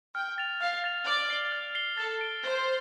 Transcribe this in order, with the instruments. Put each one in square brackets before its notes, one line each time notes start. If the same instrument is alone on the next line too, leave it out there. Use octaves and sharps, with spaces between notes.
[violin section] G5 [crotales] F6
[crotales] A6 F7
[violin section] F5 [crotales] F6
[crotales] A6 F7
[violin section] D5 [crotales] F6
[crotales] C7 G7
F6
C7 G7
[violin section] A4 [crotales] A6
[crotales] D7 G7
[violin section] C5 [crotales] A6